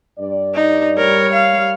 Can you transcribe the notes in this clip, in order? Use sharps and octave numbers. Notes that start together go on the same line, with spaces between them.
G2 D5
D#4
G3 A#4 C#5
F5